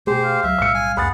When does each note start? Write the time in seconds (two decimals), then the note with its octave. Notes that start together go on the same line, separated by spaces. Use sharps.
0.07 B2 A3 G4 G#4 C5
0.23 F5
0.43 C#2 F#3 E5
0.59 B1 A2 G3 E6 C#7
0.75 G#5
0.97 C#2 F#2 G#4 F#5 B5 A6